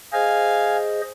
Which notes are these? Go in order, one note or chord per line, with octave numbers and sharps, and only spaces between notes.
G#4 C5 D#5 F5 G#5